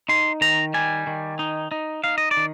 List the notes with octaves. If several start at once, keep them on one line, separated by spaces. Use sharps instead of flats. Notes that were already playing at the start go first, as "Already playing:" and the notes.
D#4 C6
D#3 A#5
G3 G#5
D#3
D#4
D#4
D#4 F5
D#5
D5
D#3